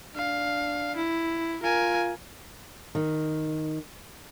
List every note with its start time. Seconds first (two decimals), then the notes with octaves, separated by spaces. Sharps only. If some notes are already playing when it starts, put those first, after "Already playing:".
0.16 D4 F5
0.96 E4
1.63 F4 A#4 G#5
2.95 D#3